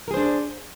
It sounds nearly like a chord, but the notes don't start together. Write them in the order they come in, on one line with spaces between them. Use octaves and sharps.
A#4 G#4 C5 D4